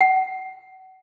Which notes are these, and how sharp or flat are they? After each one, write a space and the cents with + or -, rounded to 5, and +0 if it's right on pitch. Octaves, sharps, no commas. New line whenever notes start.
F#5 +30